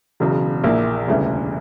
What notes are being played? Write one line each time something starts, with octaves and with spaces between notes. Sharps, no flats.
E1 E2 C#3 F#3
A#1 A#2 A#3 E4
E1 D2 C#3 E3 G3